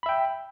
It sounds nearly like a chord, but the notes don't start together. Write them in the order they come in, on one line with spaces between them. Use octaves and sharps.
B5 E5 G5